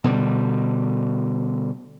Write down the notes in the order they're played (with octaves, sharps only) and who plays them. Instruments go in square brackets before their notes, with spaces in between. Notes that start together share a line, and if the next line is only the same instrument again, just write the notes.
[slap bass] B2 D3 G3